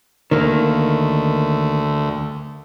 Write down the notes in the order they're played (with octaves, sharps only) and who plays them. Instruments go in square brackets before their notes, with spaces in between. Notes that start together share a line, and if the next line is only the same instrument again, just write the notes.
[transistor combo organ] D2 [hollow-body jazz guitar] D#3 A#3